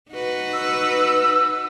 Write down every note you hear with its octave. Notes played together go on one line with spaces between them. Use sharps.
D#4 F#4 B4
E6